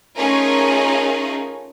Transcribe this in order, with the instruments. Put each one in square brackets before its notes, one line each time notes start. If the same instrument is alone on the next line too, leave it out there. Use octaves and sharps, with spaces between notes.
[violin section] A3 C#4 D#4 F4 G#4 A#4